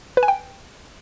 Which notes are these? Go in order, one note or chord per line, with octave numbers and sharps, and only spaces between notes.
B4
G#5
G5